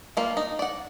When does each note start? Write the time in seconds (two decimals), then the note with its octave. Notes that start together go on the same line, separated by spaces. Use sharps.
0.17 G3 A#3 F4
0.37 D#4
0.59 D5 F#5